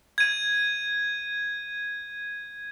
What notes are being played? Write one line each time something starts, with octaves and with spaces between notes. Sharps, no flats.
G#6 D#7